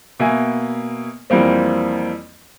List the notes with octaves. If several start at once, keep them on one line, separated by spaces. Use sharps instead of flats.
B2 A#3 E5 G#5
F2 E3 G3 A#3 C4